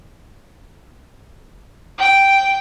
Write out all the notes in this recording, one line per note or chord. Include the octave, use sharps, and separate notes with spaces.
G5